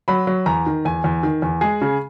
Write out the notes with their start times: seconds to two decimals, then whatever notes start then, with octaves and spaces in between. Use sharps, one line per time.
0.08 F#3 B5
0.27 F#3
0.46 E2 A#5
0.66 D#3
0.85 E2 G#5
1.04 E2
1.23 D#3
1.42 E2
1.61 G#3 G#4
1.81 C#3